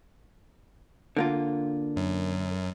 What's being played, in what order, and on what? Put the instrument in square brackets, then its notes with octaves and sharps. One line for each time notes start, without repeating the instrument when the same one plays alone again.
[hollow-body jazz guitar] D3 A#3 F4
[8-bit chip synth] F#2